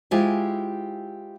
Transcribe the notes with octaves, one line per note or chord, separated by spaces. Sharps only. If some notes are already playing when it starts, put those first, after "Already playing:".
G#3 E4 F4 G4 C5 G#5